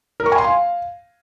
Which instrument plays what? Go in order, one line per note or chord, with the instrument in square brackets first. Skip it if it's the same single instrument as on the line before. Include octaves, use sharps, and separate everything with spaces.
[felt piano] A#4
C#6
G#5
C6
F5